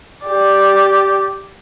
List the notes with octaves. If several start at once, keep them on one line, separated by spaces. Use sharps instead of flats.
G4 D5